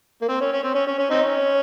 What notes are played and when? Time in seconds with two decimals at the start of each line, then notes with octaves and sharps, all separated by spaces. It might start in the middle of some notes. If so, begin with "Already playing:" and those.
0.22 A#3
0.29 C4
0.41 C#4
0.52 C#4
0.63 C4
0.75 C#4
0.87 C#4
0.99 C#4
1.10 C4 D#4
1.22 C#4